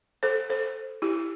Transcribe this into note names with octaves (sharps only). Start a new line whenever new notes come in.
A4 C5
A4 C5
E4 G4